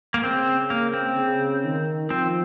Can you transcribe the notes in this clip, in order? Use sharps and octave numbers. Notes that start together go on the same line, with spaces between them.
A#3
C#3 C4
A#3
C4
C#3
D#3
F3 C4